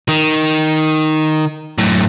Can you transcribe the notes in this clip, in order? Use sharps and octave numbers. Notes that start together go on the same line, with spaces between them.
D#3
F#2 A2